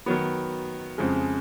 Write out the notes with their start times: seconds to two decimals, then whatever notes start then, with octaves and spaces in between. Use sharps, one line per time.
0.06 D#3 F#3 B3
0.98 F2 C#3 G#3